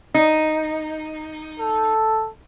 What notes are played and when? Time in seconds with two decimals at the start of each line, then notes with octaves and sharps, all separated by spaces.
0.14 D#4
1.60 A4